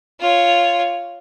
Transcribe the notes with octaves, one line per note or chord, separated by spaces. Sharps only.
F4 C#5